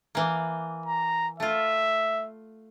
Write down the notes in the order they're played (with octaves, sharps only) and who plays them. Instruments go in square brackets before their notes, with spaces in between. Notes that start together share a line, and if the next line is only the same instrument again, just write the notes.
[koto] E3 A#3
[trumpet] A#5
[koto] A3 F4 [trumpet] E5